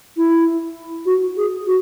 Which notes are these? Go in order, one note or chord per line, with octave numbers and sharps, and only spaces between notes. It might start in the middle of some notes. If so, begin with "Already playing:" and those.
E4
F#4
G#4
F#4